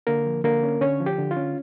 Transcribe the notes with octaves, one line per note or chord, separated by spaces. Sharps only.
D3 A#3 A#4
F3
D3 A#3 A#4
C#4
D3 C#4 C#5
F3
G4
D3
F4
C#4